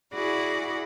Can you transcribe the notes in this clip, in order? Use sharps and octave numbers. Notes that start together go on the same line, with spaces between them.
E4 F#4 G#4 D5 F#5 B5